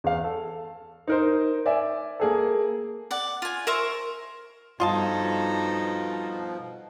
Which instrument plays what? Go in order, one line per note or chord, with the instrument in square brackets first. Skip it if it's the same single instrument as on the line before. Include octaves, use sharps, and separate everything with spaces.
[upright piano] E2 F5
A4
D#4 A#4 C5
D5 E5 G#5
A#3 G#4 A4
[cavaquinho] D5 F#5
F4 G#5
A#4 C5 E5 C#6
[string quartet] G2 D#4 A4 [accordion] B2 F3 [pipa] F4 D#5 A5